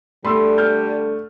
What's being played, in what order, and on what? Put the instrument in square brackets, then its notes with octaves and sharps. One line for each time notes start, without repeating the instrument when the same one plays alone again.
[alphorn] D3 [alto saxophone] G3 [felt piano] A3 [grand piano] B5 C6 E6
[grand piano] F6 G6